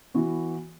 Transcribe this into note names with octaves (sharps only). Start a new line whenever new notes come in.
E3 B3 F#4